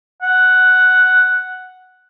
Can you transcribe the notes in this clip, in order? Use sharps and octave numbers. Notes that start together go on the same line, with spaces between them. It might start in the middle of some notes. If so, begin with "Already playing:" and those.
F#5